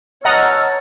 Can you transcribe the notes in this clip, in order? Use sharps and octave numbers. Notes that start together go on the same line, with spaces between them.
E2 C#5 D#5 F#5 A5 A#5 E6 F6